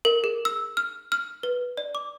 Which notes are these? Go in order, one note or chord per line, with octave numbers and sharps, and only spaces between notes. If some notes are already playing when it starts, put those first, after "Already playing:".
A#4
G#4
E6
F6
F6
B4
D5
D6